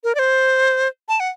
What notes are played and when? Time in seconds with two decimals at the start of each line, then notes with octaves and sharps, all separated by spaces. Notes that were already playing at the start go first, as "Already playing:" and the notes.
0.04 A#4
0.15 D5
0.19 C5
1.09 A5
1.20 F#5